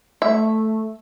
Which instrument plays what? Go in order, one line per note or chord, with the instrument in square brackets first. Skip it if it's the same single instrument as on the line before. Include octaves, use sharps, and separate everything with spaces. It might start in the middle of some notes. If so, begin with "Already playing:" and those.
[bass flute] A3 [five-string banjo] E5